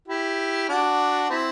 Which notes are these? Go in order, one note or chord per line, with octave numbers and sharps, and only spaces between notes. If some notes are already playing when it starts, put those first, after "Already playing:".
E4 G4
D4 F#4
C4 E4